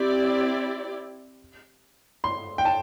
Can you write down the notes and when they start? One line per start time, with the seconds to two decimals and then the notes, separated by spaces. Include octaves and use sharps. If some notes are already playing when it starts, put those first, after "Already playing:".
Already playing: C4 E4 G4 D5
2.24 C6
2.58 G5
2.65 A5